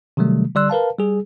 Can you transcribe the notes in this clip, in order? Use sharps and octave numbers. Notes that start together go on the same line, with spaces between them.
C3 D#3 F#3 G3 A3
D3 G3 D5 C6 E6 F#6
A#4 B4 F5 A5
G3 G#4